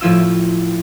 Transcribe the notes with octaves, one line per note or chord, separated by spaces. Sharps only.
A2 F3 E4 F4 E6